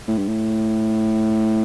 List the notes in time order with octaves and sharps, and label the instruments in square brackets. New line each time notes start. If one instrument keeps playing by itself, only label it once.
[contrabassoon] A2
G2
A2